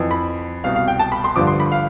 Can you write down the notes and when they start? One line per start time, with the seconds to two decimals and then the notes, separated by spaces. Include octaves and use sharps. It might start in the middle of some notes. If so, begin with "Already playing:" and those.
Already playing: F2 E3
0.11 B5
0.64 C2 B2 F5
0.76 F5
0.88 G5
0.99 A5
1.12 B5
1.24 C6
1.36 G2 D3 F3 D6
1.47 C6
1.60 B5
1.72 F5